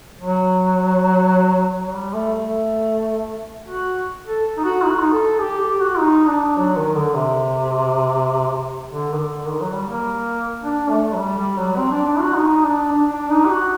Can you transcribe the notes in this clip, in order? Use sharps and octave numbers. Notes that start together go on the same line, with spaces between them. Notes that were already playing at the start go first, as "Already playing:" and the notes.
F#3
F#3
G3
A3
A3
F#4
A4
D#4
F#4
D#4
F#4
D#4
A4
G4
G4
F#4
D#4
D4
F#3
D#3
D3
C3
D3
D#3
D3
D#3
F#3
G3
A#3
D4
A3
F#3
G3
G3
F#3
C4
D4
D4
F#4
D#4
D4
D4
D4
D#4
G4
F#4